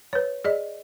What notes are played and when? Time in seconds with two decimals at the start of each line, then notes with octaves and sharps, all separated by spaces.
0.13 B4 C#5
0.44 G#4 D5 D#5